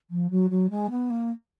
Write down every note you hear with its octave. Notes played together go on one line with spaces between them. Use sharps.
F3
F#3
F#3
G#3
B3
A#3